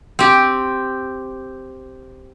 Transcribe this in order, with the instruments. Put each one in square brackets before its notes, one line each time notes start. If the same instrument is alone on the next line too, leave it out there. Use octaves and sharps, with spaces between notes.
[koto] C4 G4